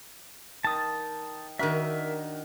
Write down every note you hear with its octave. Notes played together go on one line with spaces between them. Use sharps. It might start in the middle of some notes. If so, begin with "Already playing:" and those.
D#3 A5 D#6
D#3 D4 F#4 A#4 E5